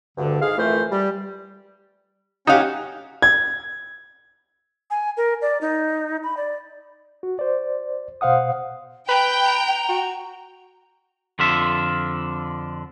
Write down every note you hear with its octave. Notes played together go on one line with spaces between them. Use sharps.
D2 G2 D3
G#2 G#3 G#4 F5
F2 E3 A3 A#4 C5
G3
C#4 D#4 F#4 G4 F5 F#5
G#6
G#5
A#4
D5
D#4
B5
D5
F#4
C5 D5
B2 C5 F5 F#5 D#6
B4 G5 A#5
A#5
F#4
F2 D3 F4 E5